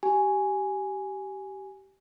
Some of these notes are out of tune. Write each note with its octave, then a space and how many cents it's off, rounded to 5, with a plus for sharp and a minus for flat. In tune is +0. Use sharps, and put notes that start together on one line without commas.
G4 -20 G#5 +0